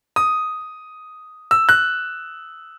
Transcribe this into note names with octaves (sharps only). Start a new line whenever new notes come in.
D#6
E6
F#6